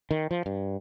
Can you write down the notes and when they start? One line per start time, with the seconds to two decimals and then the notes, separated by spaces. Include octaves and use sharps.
0.11 D#3
0.31 F3
0.46 G2